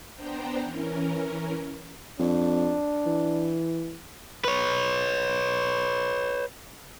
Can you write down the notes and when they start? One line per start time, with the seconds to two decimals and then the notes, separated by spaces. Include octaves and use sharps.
0.14 B3 D4 C5 G5 A#5
0.63 E3 C#4 A#4
2.19 F2 D4
3.06 E3
4.44 B4 C#5